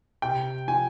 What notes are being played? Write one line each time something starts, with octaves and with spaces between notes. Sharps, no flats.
C3 G5
F3 G#5